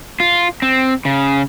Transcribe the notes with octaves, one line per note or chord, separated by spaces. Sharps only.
F4
C4
C#3